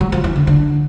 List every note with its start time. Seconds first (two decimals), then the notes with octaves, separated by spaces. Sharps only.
0.01 F#3
0.12 F3
0.24 E3
0.36 D3
0.47 D3